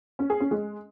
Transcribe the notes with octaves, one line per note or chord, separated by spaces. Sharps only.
C#4
G#4
C#4
G#3